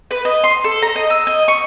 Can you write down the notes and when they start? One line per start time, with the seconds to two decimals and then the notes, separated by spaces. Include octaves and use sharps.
0.11 B4
0.25 D#5
0.44 C6
0.64 A4
0.82 A#5
0.96 D#5
1.10 E6
1.27 D#5
1.48 C#6